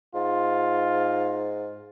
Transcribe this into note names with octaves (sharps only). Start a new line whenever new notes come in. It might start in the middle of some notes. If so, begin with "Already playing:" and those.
G#2 F4